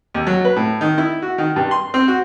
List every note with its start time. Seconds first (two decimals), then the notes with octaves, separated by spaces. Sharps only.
0.14 D#2
0.27 F#3
0.45 B4
0.56 A2
0.81 D#3
0.98 E4
1.22 F#4
1.38 D#3
1.56 G2
1.71 C6
1.94 C4
2.08 F#4